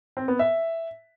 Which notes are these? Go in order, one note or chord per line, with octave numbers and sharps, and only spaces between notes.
C4
B3
E5